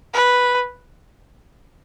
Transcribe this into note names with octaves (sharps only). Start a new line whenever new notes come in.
B4